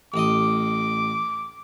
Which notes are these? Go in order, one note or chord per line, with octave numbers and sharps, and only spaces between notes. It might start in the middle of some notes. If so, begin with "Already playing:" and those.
A1 D#5 D6